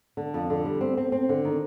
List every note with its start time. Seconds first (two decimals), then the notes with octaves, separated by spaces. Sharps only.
0.17 D3
0.34 F2
0.50 D3
0.65 G3
0.81 C4
0.97 C4
1.12 C4
1.29 D3
1.45 D#3